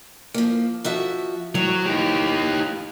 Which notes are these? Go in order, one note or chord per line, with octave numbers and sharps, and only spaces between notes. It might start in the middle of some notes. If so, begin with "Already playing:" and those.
F3 A#3
F3 F#4 E5
F2 A2 F#3
D#4 G4